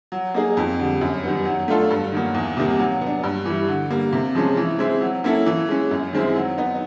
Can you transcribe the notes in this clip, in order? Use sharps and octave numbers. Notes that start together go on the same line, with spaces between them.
F#3
A#3 D#4 G#4
F2
D3 G3
F#2
D#3 G3 B3
F#3
A3 D4 F4 A4
G2
D#3 F#3 A#3
E2
C3 D#3 G3 A#3
F#3
B3
D4
G2
E3 G3
D3
G3 A#3
C3
F3 G#3 C#4
E3
G#3 C4 E4
F#3
A#3 C#4 E4 A4
E3
G#3 C#4
F#2
D#3 G#3 C4 E4
F#3
B3 D#4